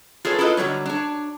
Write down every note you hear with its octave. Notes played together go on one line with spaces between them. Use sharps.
F4 G#4 A4 B4 C#5
E4 F4 A4 B4 D#5
D3 F#3 G3 C#5
D4 C#5